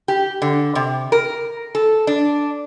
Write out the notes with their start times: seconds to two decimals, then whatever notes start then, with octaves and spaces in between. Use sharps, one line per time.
0.08 G4
0.42 D3
0.75 C3
1.12 A#4
1.75 A4
2.07 D4